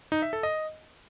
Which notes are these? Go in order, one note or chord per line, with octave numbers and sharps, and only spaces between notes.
D#4
E5
A4
D#5